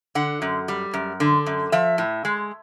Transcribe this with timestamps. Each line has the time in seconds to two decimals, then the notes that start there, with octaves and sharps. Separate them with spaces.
0.15 D3 F#5
0.42 F#2
0.68 G3
0.94 F#2
1.20 D3
1.46 F#2
1.72 F3 E5
1.98 A2
2.25 G#3